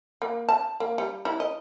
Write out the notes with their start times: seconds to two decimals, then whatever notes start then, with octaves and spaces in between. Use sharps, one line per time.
0.22 A#3
0.49 A5
0.80 A#3
0.98 G3
1.25 E4
1.40 D#5